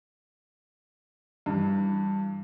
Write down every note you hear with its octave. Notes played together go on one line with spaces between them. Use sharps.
G2 E3